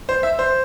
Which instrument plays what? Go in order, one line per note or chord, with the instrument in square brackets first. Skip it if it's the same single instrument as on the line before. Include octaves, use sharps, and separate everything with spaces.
[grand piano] C5
E5
C5